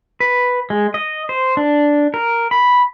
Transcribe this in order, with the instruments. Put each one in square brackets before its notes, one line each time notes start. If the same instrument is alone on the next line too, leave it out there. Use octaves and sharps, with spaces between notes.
[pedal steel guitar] B4
G#3
D#5
C5
D4
A#4
B5